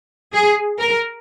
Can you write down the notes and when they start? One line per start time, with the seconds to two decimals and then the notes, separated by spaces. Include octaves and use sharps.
0.33 G#4
0.79 A#4